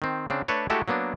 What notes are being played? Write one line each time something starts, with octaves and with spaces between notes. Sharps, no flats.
D#3 C4
C#3 C4 D4
A3 D4 A4 B4 C#5
G#3 A3 E4 F#4 G4 A4
F#3 A#3 B3 D4